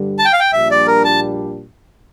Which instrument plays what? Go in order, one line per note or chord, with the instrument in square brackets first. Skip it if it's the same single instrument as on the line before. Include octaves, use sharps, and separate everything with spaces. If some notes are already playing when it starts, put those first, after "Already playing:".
Already playing: [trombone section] G2 D3 G3
[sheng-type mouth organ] A5
G5
F5
G5
[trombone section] A#1 A#2 G3 D4 [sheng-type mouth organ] E5
[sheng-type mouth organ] D5
A#4
A5